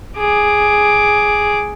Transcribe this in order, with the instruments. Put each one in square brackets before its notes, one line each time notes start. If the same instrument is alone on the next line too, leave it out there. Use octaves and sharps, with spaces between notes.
[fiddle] G#4 D6